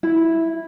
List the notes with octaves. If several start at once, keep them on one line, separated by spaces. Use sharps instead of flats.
E4